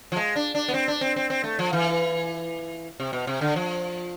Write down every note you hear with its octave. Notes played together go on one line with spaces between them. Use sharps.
F3
G#3
D4
D4
B3
C4
D4
C4
C4
C4
A3
F3
E3
C3
B2
C3
D3
F3